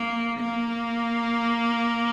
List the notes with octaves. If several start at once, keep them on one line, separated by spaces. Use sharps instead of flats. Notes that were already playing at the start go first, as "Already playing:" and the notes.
Already playing: A#3
A#3